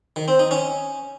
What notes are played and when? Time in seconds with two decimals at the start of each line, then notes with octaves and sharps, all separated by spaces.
0.16 D#3
0.28 C4
0.39 D#4
0.51 C#4